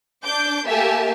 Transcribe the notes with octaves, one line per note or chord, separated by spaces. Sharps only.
D4 D6 G6
A3 A#3 G4 E5 G#5 A5